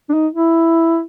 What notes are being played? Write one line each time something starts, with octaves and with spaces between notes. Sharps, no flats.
D4
D#4
E4